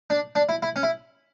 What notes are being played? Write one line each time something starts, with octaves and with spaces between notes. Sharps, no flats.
D4
D4
E4
E4
C#4
E4